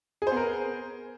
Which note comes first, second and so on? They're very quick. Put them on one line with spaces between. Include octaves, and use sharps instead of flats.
G#4 C5 B3 A#4